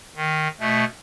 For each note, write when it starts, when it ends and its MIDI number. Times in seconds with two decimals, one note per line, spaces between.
0.16 0.48 51
0.60 0.84 47
0.60 0.84 57